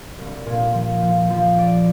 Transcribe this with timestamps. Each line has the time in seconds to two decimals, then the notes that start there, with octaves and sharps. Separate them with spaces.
0.18 C2
0.46 A#2
0.74 F3
1.02 F3
1.30 F3
1.58 D5